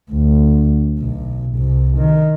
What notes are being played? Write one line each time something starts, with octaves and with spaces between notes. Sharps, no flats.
D2
B1
C2
D#3